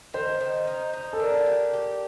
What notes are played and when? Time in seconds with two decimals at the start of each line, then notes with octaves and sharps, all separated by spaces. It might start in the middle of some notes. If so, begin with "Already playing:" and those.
0.14 D#3 C5
0.40 D#3
0.67 D#4
0.93 D#4
1.13 A4
1.19 D4 A#4
1.46 G4
1.73 G4